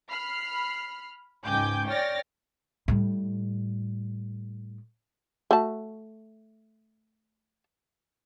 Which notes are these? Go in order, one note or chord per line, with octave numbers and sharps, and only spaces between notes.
B5 F6 C7
C#2 G#2 G5 G#5 D6 G6
C#5 D5 G5 F6 A6 A#6
A2 G3
A3 F#4 A5